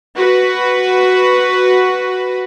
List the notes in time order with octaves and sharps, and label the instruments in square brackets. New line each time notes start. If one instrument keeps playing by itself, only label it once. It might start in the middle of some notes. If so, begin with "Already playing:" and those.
[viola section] F#4 B4